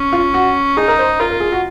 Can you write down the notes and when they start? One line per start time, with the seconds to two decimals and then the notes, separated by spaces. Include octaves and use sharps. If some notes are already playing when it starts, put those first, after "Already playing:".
Already playing: C#4
0.13 F4
0.34 F#4
0.77 D#4 G#4
0.88 A#4
0.99 C5
1.20 F4 A#4
1.31 A#4
1.40 G#4
1.52 F#4